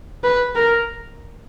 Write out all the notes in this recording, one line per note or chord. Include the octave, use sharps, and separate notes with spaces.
B4
A#4